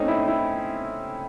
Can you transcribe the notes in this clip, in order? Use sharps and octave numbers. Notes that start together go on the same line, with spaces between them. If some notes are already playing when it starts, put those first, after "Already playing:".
Already playing: A3 C4 C#4 D#4
E4
E4